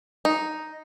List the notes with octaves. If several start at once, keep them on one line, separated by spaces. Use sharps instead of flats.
D#4